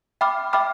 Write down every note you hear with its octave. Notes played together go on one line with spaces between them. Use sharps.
E5 G5 B5 D6 F6
E5 G5 B5 D6 F6